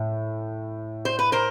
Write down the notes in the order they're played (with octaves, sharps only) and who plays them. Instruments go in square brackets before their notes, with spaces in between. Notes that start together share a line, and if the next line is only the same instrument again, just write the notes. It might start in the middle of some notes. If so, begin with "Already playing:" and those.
Already playing: [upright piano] A2
[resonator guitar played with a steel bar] C5
B4
A#4 C5